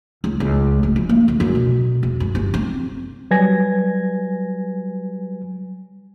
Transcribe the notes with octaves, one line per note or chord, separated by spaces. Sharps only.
C#2
C#2
D1
F3
A#3
D2
F#2
B2
E1
F#2
G1
C4
F#3 G3 B4 G#5 G#6 A#6